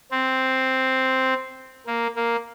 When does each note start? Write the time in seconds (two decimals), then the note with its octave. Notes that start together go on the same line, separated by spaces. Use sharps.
0.12 C4
1.87 A#3
2.16 A#3